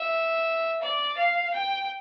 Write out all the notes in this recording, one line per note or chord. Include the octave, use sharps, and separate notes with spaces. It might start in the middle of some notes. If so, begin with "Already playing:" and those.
Already playing: E5
D5
F5
G5